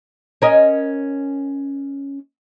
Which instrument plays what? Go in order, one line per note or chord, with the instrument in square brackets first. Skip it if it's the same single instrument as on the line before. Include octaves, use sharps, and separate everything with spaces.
[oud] C#4 A#4 D#5